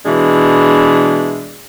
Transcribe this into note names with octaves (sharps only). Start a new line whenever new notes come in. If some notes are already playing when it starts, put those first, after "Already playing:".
B2 E3 G#3 D4